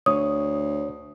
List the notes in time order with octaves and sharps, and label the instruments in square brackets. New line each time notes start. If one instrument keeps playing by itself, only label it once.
[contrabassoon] D2 [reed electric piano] C#5 [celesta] D#6